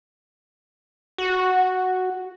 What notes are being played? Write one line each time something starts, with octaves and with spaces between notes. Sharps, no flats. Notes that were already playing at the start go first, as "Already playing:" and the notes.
F#4